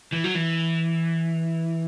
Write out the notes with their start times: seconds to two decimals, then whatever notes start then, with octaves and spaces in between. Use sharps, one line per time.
0.12 E3
0.24 F#3
0.35 E3